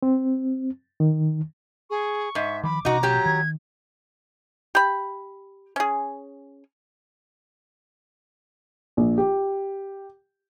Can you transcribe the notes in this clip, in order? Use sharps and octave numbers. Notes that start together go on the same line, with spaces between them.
C4
D#3
G#4 C#6
G#2 E5
D#3 F3 B5 D6
A1 B2 C#4 D#4 F#4 A#5
F#3 G4
D#3 G#6
G4 B5
C#4 G#4
A#1
G4